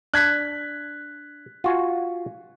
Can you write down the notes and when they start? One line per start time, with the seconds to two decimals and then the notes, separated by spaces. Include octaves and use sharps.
0.14 D4 F#6 G#6 B6
1.64 F4 F#4 G#5